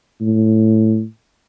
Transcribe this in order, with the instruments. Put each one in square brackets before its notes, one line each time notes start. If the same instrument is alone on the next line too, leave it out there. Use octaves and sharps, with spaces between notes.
[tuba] A2